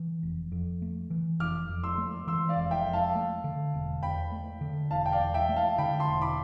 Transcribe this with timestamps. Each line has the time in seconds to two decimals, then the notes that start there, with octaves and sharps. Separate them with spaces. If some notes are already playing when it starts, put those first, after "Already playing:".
Already playing: E3
0.23 F1
0.52 F2
0.82 A3
1.10 E3
1.39 F1 D6 F6
1.69 F2
1.83 C6 E6
1.98 A3
2.27 E3 C6 E6
2.49 D5 F5
2.56 F1
2.71 E5 G5
2.86 F2
2.93 F5 A5
3.16 A3
3.44 D3
3.74 E1
4.03 E2 G5 B5
4.32 A3
4.61 D3
4.91 E1 F5 A5
5.06 G5
5.12 D5 F5
5.20 E2
5.34 E5 G5
5.49 A3
5.56 F5 A5
5.78 D3 G5 B5
6.00 A5 C6
6.07 E1
6.21 B5 D6